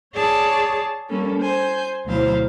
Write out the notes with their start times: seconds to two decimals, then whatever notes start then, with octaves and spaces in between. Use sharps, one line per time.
0.14 G#4 C#5 D5 A5
1.09 G3 A#3 C#4 A4
1.41 C5 G#5 G6
2.06 D2 B2 F#3 E4 C5 F5